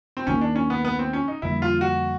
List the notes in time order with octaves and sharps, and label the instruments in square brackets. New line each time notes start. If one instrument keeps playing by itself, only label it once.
[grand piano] C4
[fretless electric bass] D#2 D#3 F#3 A#3 [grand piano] C#4
[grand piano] D4
C#4
B3
B3
C4
C#4
D#4
[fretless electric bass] F2 D3 G3 A#3 [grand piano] E4
[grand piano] F4
F#4